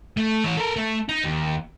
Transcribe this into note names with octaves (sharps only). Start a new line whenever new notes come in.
A3
E3 C#5
A4 A#4
A3
D#4
D#2